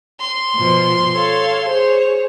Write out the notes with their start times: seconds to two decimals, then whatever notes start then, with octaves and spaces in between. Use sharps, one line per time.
0.20 C6
0.55 B2 F3
1.15 A4 C#5 F5
1.68 G#4 C5 C#5